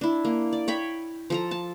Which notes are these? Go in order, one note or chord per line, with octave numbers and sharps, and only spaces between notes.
D4 E4
A#3
D5
C#5 G5 B5
F3 A4 A#5
A5